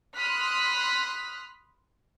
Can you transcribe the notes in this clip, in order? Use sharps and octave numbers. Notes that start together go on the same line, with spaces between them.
B5 C6 D#6 F6 F#6 B6